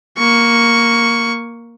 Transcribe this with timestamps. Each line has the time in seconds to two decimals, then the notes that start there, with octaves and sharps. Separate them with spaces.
0.18 A#3 C#6